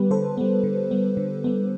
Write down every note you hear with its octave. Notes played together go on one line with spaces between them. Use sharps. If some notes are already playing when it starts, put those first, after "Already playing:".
Already playing: D3 G3 B3 G4 B4
D3 A4 C5
G3 B3
D3
G3 B3
D3
G3 B3